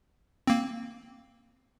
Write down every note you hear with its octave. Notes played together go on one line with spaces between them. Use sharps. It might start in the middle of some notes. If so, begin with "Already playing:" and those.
A#3 C4